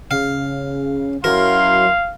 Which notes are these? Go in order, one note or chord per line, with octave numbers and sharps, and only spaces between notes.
C#3 F5
F#2 F#3 E4 A#4 F5 C6